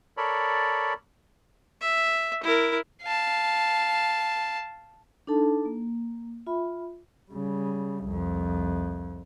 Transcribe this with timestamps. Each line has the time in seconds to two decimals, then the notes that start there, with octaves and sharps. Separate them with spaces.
0.17 A4 A#4 C#5 D5 B5
1.81 E5
2.43 E4 A#4
3.03 F5 A5
5.27 D4 D#4 A4 A5
5.65 A#3
6.47 F4 E5 B5
7.31 C#3 G3
8.06 C2 F2